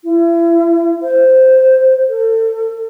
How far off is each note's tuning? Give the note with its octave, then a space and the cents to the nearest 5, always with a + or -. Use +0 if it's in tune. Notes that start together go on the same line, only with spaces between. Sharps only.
E4 +35
C5 -5
A4 +35